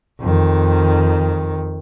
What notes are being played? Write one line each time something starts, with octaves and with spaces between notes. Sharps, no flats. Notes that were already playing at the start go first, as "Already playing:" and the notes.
F2 D#3